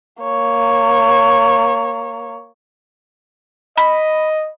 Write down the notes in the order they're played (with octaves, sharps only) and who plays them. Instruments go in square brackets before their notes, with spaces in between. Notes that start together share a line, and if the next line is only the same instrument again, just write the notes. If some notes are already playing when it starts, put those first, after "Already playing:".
[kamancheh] A#3 C#5
[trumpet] D#5 [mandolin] B5